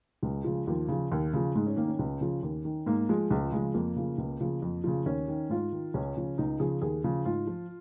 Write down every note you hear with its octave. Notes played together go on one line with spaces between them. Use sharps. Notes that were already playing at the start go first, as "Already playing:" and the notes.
C#2 G#3
C#3 F3
D#2 F3
C#3 F3
D#2
C#3 F3
G#2 G#3
C#4
D#3 A#3
C#4
C#2
C#3 F3
D#2
D#3
G#2 A#3
F3 G#3
C#2 F3
C#3 F3 G#3
F2 A#3
C#3 F3
C#2
C#3 F3
F2
C#3 F3
D#2 C#4
D#3
G#2 F4
D#3
C#2 C#4
C#3 F3
C#2 D#4
C#3 F3 G#4
D#2 G#4
C#3 F3
G#2 F4
F3